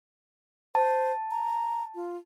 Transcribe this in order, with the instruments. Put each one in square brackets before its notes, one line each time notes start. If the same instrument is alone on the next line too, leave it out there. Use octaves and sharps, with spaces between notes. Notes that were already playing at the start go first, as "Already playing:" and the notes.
[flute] C5 [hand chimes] A5
[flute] A#5
F4